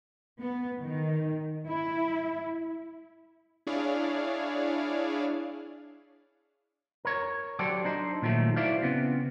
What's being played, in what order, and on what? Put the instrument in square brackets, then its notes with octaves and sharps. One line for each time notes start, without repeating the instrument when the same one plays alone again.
[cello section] B3
D#3
E4
[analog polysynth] D4 E4 G#4 C#5 D5 F5
[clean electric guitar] A#4 C#5
F#3 G4 A4 C5 D5
D4 D#4 C5
A#2 D#3 F3 F#3 A3
E4 F#4 C5 D5 E5 F5
C#3 B3 C4